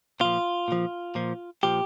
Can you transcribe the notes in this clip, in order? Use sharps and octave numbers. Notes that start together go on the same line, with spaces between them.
A#2 F3 F4
A#2 F3
A#2 F3
A#2 F3 G4